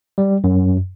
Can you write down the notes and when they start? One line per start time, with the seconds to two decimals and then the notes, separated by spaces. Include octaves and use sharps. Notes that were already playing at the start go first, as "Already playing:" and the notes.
0.18 G3
0.44 F#2